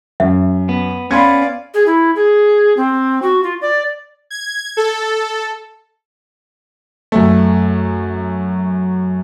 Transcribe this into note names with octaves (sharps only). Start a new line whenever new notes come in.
F#2 E5
B3
B3 C#4 D5 F5 B5 C6 G#6
G#4
E4
G#4
C4
F#4
F4
D5
G#6
A4
F#2 A3